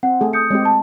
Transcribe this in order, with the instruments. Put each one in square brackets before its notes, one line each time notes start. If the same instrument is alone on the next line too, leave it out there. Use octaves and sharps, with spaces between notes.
[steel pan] C4 [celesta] F#5
[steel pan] A3 G#4
[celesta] D#6 G6 C#7
[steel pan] G#3 C4 G4
[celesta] A5